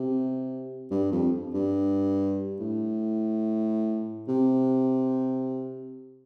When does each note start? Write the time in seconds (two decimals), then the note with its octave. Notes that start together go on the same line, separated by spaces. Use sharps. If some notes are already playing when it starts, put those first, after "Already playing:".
Already playing: C3
0.91 G2
1.11 F2
1.54 G2
2.60 A2
4.28 C3